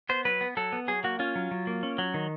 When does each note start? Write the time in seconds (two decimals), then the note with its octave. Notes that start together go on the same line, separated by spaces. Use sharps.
0.09 B3 C5
0.25 F#3 B4
0.41 B3
0.57 F#3 A4
0.72 B3
0.88 F#3 G#4
1.04 A#3 F#4
1.19 C#4 F4
1.35 F#3
1.51 F#3
1.67 A#3
1.83 C#4
1.98 F#3
2.14 D#3